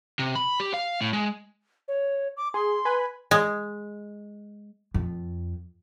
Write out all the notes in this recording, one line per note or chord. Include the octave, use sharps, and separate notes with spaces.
C3
B5
G4
F5
A2
G#3
C#5
D6
G#4 C6
B4 G#5 B5
G#3
F2